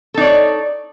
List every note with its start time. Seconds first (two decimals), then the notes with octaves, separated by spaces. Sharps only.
0.14 A4
0.18 D#4
0.21 D5
0.24 C#5